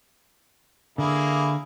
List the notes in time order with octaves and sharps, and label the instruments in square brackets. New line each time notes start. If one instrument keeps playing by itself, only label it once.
[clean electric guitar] D3 [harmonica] A#3 E4 G#4